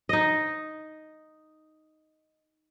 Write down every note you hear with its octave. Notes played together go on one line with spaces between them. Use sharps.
D#4 D#5